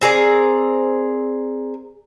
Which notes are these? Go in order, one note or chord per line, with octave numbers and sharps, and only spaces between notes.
C4 G#4 A#4 D5